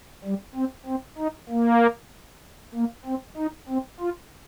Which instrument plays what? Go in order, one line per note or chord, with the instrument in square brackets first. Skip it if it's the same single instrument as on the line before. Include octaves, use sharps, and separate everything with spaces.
[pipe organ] G3
C4
C4
D#4
A#3
A#3
C4
D#4
C4
F4